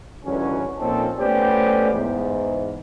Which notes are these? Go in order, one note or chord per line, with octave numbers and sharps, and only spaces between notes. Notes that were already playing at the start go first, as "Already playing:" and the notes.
G#1 C#2 D3 E3 F#3 C#4
A#2 F3 C4 C#4 D#4 A4
A3 B3 C#4 G4 C5 D5
E2 G#2